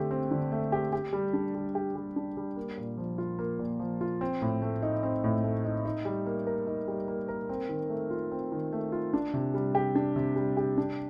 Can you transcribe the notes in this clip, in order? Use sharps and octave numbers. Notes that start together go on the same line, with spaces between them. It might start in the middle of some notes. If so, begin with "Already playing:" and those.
Already playing: D3 A3 C4 G4
C4
D3
A3
G4
G4
G3
D4
G3
G4
G3
D4
G3
A#3
A#2
F3
F4
A#3
A#2
F3
F4
C4
A2
A3
D#4
C4
A2
A3
D#4
D#4
G3
A#3
A#4
D#4
G3
A#3
A#4
C4
D#3
A3
F4
C4
D#3
A3
F4
D4
C3
G3
G4
D4
C3
G3
G4
D4